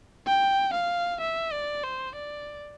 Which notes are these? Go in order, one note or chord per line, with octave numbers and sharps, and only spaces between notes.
G5
F5
E5
D5
C5
D5